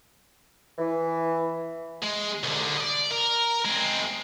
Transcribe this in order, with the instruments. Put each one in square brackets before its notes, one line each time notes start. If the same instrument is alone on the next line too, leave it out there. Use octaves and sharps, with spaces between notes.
[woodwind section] E3
[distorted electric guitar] G#3
C2 D3
D5 D#5
A#4
G#3 C4